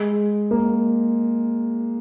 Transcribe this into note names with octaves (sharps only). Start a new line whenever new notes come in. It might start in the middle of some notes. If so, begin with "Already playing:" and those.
Already playing: G#3
A#3